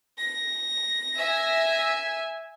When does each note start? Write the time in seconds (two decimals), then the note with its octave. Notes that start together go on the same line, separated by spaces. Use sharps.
0.18 A#6
1.18 E5 G#5